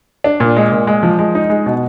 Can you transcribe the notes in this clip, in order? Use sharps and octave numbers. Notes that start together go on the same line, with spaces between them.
D4
A#2
G#3
A#2
G#3
F3
G#3
D#4
G#3
B2